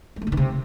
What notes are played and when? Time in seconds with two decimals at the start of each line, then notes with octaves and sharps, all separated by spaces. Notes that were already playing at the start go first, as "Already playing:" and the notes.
0.16 G#3
0.22 A3
0.27 D3
0.32 D#3
0.37 C3